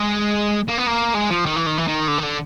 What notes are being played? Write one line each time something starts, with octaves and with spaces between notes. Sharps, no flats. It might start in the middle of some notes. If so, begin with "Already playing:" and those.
Already playing: G#3
A#3
B3
A#3
G#3
F3
D#3
E3
D#3
E3
D#3
D3
D#3
D3